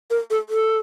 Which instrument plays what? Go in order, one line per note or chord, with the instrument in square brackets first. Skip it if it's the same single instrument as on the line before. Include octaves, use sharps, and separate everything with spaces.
[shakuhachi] A#4
A4
A4